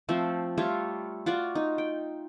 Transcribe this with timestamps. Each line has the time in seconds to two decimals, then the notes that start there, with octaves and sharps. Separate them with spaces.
0.09 F3 A3 C4
0.57 G3 A3 F4 C#5
1.26 F4 F#4 D5
1.55 D#4
1.78 G5